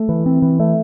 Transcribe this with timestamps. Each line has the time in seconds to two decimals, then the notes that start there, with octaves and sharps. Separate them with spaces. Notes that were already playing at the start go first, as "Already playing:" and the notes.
Already playing: A3
0.09 E3
0.26 C4
0.42 E3
0.60 A3